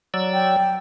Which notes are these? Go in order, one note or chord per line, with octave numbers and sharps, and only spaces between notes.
F#3 D5 E6
G5